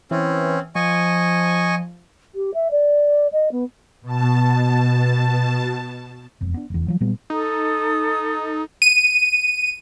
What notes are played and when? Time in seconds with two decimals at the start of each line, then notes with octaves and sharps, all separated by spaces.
0.11 E3 C4 C#4
0.75 F3 D#5 G#5 C#6
2.35 G4
2.54 E5
2.71 D5
3.33 D#5
3.52 B3
4.01 B2 A5
6.41 E1 F2
6.54 B3 D4
6.70 F1 E2
6.88 F3 F#3
7.00 A#2 F#3 G3 B3
7.30 D#4 A4 D#6
8.82 D#7